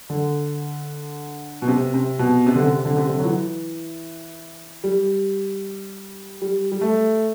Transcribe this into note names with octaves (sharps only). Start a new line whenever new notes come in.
D3
B2
C3
C3
B2
C3
D3
C3
D3
C3
D3
F#3
E3
G3
G3
G3
A3